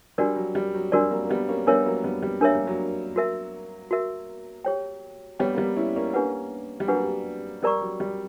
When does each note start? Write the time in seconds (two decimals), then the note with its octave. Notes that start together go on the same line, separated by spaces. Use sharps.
0.18 G3 D4 F#4 A#4 D5
0.36 F#3
0.55 G3
0.75 F#3
0.92 G3 D4 F#4 A#4 D5
1.11 F#3 A#3
1.24 A#3
1.29 G3 B3
1.49 A#3 C#4
1.67 G3 B3 D4 A#4 C#5 E5
1.86 F#3 A#3
2.04 G3 B3
2.22 G3
2.41 A#3 D4 A#4 C#5 E5
2.55 G3
2.67 F#3 A#3
3.16 F#4 A#4 E5
3.91 F#4 A#4 E5
4.65 G4 C#5 G5
5.39 G3 B3 G4 C#5 G5
5.54 A#3
5.58 G3 B3
5.76 C#4 E4
5.96 A#3 C#4
6.14 A#3 C#4 D4 G4 B4 F#5
6.80 G3
6.88 F#3 A#3 D4 G4 B4 F#5
7.63 G3 A#4 D5 A#5 C#6
7.81 F#3
8.00 G3